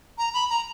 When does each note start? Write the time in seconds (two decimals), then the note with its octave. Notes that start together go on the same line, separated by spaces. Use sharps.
0.18 A#5
0.34 B5
0.50 A#5